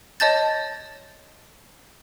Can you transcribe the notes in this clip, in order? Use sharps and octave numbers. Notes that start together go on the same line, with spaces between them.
C#5 D#5 A5 G6 A6